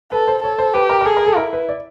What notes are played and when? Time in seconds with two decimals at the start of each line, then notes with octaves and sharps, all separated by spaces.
0.12 A4 B4
0.28 C5
0.43 A4 C#5
0.59 C5
0.74 G4 B4
0.89 A#4
1.01 A#4
1.05 G#4 A4
1.17 A#4
1.27 A4
1.37 E4 A#4
1.53 B4
1.69 D5